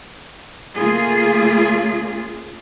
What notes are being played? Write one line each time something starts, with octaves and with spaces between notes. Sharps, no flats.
C#3 A3 A#3 F4 G#4